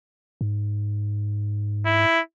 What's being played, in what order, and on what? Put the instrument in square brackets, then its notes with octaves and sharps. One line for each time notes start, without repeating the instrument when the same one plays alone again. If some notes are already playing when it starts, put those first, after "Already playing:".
[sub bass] G#2
[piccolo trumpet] E4